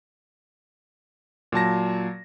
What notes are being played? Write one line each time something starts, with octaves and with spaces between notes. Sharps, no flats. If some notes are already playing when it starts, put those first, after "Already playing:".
A#2 F#3 A5 A#6